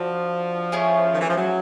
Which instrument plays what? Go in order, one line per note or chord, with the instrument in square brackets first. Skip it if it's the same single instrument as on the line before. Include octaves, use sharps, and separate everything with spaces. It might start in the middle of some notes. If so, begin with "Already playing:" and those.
Already playing: [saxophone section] F3 [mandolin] D4 F#4
[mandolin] A3 C#4 E4 G#4
[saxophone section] D#3
E3
F3
F#3